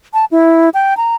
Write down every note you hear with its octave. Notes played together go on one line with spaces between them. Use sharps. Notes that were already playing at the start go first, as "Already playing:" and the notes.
A5
E4
G5
A#5